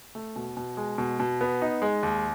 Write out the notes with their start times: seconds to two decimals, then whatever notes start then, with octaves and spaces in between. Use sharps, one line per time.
0.15 A3
0.36 B2
0.57 B2
0.77 G#3
0.98 B2
1.20 B2
1.41 B3
1.62 D#4
1.82 G#3
2.03 D#2